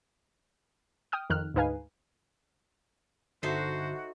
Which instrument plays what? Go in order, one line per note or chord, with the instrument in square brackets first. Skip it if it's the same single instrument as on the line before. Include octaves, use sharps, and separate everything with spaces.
[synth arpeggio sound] G5 D#6 F6
F2 D#3 F6 F#6
D2 G#2 D#4 B4 F5 G#5
[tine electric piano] G1 D3 C7 [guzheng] D#4 A4 E5 [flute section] F#4 [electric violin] C5